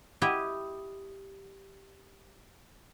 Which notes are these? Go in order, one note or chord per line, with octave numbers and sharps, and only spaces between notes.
E4 G4 D#5